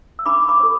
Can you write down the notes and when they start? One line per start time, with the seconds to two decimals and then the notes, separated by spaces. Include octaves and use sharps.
0.19 E6
0.26 D4 B5 D6
0.49 B5 D6
0.60 A4 C5